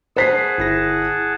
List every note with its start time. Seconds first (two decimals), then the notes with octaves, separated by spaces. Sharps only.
0.16 G#4 C5 F#5 A5 B6 C7
0.58 G1 E4 A#6